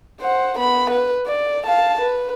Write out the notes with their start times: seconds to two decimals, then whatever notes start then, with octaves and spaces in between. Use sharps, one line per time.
0.21 C5 F#5
0.59 B3 B5
0.90 B4
1.26 D5
1.66 F5 A5
2.01 B4